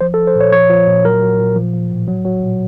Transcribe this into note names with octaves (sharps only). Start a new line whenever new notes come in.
F3 C5
A4
F3
C5
A#2 C#5
F3 C#5
F3
A#2
F#3 A#4
F#3
A#2
F3
F3
A2
F#3
F#3
A#2